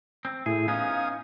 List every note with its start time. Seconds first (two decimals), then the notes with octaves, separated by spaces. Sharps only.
0.25 C4
0.46 A2 E4 G#4
0.68 B3 C#4 D#4 F5 G#5 D#6